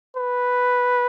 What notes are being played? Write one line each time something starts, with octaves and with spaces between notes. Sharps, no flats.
B4